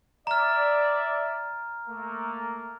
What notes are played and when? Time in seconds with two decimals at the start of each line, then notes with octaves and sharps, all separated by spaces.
0.27 D5 E5 A#5 F6
1.86 A3 A#3